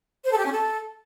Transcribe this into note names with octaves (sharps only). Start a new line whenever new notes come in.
C5
A4
G4
C#4
A4